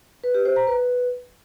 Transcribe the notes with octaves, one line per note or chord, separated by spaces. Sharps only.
B4
G4
C5
A#5
B4